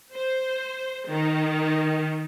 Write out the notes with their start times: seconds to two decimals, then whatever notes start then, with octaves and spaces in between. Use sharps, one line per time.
0.13 C5
1.09 D#3